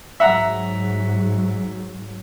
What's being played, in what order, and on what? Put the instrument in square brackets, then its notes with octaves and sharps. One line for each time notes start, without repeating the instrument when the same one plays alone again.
[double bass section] G#2 F#3 [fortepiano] E5 F#5 A#5